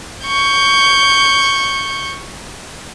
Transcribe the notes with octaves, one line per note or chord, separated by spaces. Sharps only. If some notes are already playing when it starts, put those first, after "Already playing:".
C#6 G6